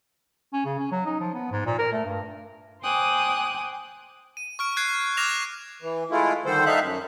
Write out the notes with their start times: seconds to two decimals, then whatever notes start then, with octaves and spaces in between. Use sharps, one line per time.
0.53 C#4
0.66 C#3
0.79 C#4
0.92 F#3
1.06 D#4
1.20 F3
1.34 B3
1.52 G#2
1.66 A#2
1.79 A#4
1.93 A3
2.05 G2
2.82 C5 G5 G#5 D6 D#6 F#6
4.37 D#7
4.59 C#6 F6 D7
4.77 F#6 G#6 C7
5.17 D6 F6 A#6 E7 F7
5.82 E3
6.11 G#3 A3 E4 F4
6.45 D3 D#3 G3 A4 C5
6.66 G3 D#4 A4 E5 F5 F#6
6.81 F#2